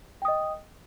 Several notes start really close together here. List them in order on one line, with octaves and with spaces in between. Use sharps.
G5 D#6 D#5